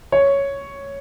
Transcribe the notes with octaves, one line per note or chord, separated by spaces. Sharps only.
C#5